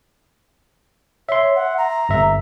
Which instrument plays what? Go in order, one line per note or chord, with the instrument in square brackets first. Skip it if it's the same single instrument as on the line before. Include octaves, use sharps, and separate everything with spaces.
[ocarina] C#5 [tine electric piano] E5 C6
[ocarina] F#5
A#5
[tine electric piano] G1 E5